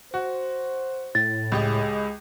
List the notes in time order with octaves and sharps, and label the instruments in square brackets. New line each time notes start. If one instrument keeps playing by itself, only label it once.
[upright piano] F#4 [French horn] C5
[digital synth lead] A2 [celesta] A6
[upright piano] C#2 G4 D#5 [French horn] G#3